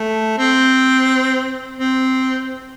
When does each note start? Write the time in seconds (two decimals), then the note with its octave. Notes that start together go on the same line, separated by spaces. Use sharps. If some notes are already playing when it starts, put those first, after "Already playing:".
Already playing: A3
0.38 C4
1.77 C4